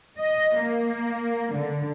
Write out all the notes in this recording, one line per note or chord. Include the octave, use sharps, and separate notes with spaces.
D#5
A#3
D3